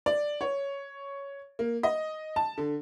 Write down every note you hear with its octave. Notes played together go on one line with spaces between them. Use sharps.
D5
C#5
A#3
D#5
A5
D3